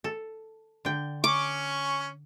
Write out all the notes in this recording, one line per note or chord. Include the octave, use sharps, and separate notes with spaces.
A4
D3 G5
C#4 C#6 D6